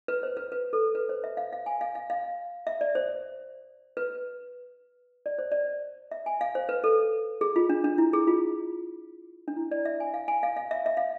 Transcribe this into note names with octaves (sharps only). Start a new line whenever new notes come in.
B4
C5
B4
B4
A4
B4
C5
E5
F5
F5
G#5
F5
F5
F5
E5
D5
C5
B4
D5
C5
D5
E5
G#5
F5
C5
B4
A4
G#4
F4
D4
D4
E4
G#4
F4
D4
E4
D5
E5
G#5
F5
G#5
F5
F5
E5
E5
F5